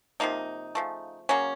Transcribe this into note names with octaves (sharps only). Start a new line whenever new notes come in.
C3 F3 A#3 D#4
C#3 F3 A3
C#3 F#3 A#3 C#4